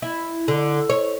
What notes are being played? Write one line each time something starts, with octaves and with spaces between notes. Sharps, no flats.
E4
D3
C#5